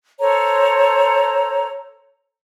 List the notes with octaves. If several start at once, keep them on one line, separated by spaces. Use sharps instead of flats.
A4 C5 C#5 A#5